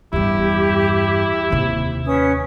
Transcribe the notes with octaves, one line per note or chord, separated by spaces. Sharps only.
E2 G2 E4 G4
D#2 C3
C#4 B4 D#6